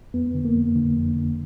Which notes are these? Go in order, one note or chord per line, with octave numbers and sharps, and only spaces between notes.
F2 B3
D3
A#3
F2
D3
F2
D3